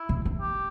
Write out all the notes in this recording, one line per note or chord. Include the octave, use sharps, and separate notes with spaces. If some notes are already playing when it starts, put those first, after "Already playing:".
Already playing: E4
C#3
C#3
G4